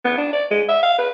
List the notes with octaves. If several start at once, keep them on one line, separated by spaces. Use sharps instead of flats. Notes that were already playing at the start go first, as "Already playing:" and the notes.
B3
D4
D5
G#3
E5
F5
B4